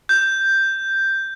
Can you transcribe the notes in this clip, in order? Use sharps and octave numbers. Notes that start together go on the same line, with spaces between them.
G6